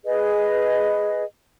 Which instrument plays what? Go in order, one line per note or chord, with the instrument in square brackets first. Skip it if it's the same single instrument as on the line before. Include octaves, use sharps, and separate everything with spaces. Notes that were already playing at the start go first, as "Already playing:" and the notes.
[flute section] G#4 B4 D#5